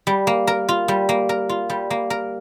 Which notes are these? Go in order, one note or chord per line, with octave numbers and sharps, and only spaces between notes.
G3
A#3
A#4
F4
G3
A#3
A#4
F4
G3
A#3
A#4